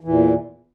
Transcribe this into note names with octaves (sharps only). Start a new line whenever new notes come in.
E2 A#2 E3